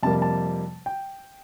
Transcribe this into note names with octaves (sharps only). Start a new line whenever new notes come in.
F2 C3 G3 A#3 A5
A5
G5